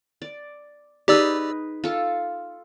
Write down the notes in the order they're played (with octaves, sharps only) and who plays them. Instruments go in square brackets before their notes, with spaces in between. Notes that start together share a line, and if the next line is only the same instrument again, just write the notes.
[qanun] D5
[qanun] D#4 G#4 B4 [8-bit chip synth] G4 D5 E6
[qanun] F4 A4